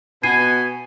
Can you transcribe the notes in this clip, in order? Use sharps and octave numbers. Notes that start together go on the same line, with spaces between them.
B2 B3 G#5 G#6 C7 D#7